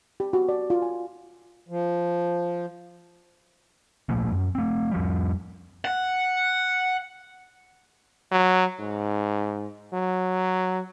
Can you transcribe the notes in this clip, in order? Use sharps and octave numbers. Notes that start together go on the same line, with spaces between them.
G4
F#4
D5
F4
G#5
F3
A#2 F3 A3 A#3
F#2
A3 C4
F2 F3 G3
F#5
F#3
G#2
F#3